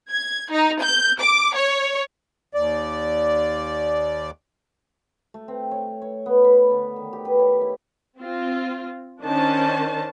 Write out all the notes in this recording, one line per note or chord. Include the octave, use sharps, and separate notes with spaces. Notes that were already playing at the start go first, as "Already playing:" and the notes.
G#6
D#4
G6
D6
C#5
D#2 D5
A3
C4
C#5
C#5
B3
B4
D3
D#3
G4
B4
C#5
E4
C4 F4
D#3 C#4 D4 C5 A5